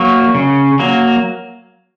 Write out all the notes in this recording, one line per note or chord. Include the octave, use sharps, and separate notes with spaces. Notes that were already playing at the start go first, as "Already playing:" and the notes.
Already playing: F#3 A#3
C#3
F#3 A#3